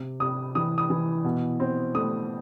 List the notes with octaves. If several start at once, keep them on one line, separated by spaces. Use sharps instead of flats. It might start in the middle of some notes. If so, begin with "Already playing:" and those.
Already playing: C3
C3 D#6
E3 D#6
D#6
E3
B2
C4
A3 D#6